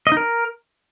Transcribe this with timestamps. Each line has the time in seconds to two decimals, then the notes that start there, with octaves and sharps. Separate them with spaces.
0.07 D#5
0.12 D#4
0.17 A#4